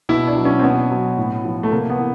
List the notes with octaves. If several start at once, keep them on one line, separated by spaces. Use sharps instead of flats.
B2 E4
D4
F#3
C#4
C4
B2 B3
F#3
A2
F3
A3
C3 A#3
B3
E3